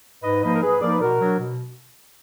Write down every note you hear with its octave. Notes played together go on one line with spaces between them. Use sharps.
G#2 B4 D#5
F3 A#3 D#4 B4 D#5
A#4
G#2 G#4 B4
F3 A#3 D#4 A#4 D5
B4
B2 F#4 A#4
F#3 D4
B2